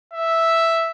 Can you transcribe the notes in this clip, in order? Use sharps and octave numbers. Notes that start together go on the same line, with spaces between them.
E5